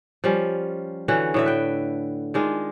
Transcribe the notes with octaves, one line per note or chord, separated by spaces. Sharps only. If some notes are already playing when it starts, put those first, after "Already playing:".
F3 G3 C#4
D3 E3 C#4 F#4
A2 D3 E5
B4 G5
D#3 G#3 D4 F4